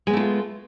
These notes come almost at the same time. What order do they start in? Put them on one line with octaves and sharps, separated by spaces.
G#3 B3 A3 E4 F4